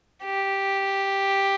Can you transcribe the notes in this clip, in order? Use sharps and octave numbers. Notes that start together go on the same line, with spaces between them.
G4